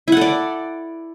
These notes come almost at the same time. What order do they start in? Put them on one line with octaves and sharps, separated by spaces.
E4 F#5 A4 D5